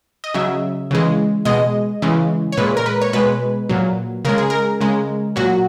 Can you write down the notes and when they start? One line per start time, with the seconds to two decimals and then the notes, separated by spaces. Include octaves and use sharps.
0.24 D#5
0.34 C#3 F#3 E5
0.91 C#3 E3 G#3
1.45 B2 G#3 D#5
2.02 C#3 E3 G#3
2.52 C#5
2.57 A#2 G#3 B4
2.77 A#4
2.86 B4
3.02 C#5
3.13 B2 G#3 B4
3.69 A#2 F#3
4.25 C#3 G#3 A#4
4.38 G#4
4.50 A#4
4.80 C#3 G#3
5.36 A#2 F#3 F#4